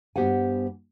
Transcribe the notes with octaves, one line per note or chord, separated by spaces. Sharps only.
G2 B3 G4 C5 F#5 G#5